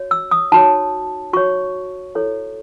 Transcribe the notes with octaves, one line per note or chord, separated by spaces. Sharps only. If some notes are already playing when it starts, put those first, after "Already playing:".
Already playing: F#4 C#5
E6
D#6
D#4 F#4 C#5 A5
F#4 C#5 C#6
E4 A4 C#5